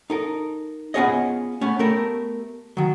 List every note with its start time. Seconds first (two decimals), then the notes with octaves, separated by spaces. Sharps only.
0.10 D#4 A4 A#4
0.94 B3 C#4 F4 G#4 C#5 D#5
1.61 A3 B3 C#4
1.79 A3 B3 G4 A4 A#4
2.77 D#3 F#3